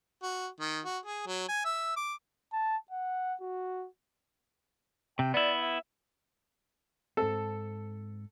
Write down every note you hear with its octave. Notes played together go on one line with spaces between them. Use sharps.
F#4
D#3
F#4
G#4
F#3
G#5
E5
D6
A5
F#5
F#4
C3 G5
B3 E4 D5
E5
G#2 C4 A4